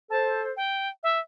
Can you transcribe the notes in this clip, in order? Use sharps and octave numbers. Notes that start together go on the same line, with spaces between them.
A4 C5 A5
G5
E5